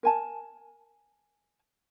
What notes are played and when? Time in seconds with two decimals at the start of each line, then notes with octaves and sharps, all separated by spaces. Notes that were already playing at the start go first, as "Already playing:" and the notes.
0.03 A#4 G#5 A5